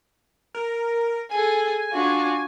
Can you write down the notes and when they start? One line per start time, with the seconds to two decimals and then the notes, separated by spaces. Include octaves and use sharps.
0.55 A#4
1.31 G#4 A4 G#5
1.92 D4 F4 F#4